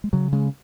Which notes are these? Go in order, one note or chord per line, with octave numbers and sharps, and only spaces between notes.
G#3
C#3 F#3
C#3 G#3